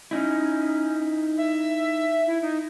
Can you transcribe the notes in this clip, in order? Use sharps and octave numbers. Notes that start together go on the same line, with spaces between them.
C#4 D#4 E4
E5
E4
D#4